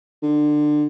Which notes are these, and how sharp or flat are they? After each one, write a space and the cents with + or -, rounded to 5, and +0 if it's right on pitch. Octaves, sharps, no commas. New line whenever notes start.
D3 +25